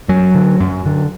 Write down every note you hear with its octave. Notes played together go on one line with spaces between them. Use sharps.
F#2 F#3
D3
F#2
D3